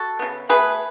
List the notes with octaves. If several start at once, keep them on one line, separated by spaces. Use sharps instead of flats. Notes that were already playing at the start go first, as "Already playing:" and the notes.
Already playing: F#4 A4
C#3 F#3 B3
B2 A3 G#4 B4